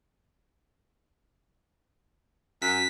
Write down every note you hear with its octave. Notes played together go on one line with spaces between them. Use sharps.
F#2 B6